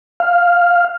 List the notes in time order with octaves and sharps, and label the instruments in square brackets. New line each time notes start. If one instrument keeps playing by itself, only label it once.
[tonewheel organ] F5